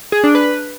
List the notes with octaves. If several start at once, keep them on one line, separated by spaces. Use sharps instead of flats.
G#4
D4
B4